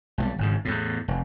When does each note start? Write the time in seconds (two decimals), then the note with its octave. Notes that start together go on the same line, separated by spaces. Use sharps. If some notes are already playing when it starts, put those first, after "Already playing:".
0.18 B1 F#3 G3
0.38 G#1 G#2 C#3
0.65 E2 A2
1.08 F1